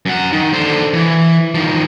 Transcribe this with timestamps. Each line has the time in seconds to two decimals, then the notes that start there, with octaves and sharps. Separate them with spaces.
0.06 F#2 F#5
0.33 D#3
0.53 D3 C5
0.93 E3
1.55 D#3 F3